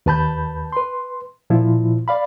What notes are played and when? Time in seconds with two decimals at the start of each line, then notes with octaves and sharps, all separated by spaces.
0.06 D#2 B4 A5 B5 G6
0.72 B4 C6
1.50 A#2 F3 E4 F4
2.08 D5 F5 B5